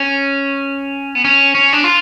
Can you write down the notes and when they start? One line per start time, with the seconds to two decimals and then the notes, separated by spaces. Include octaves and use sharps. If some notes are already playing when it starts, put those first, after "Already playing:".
Already playing: C#4
1.15 B3
1.25 C#4
1.55 C#4
1.73 D4
1.84 F4